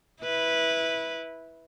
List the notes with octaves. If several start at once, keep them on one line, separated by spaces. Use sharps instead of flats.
E4 B4